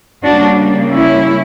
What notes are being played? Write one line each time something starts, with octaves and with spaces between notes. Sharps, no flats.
C#3 G3 A#3 D4 F#4
C#4 E4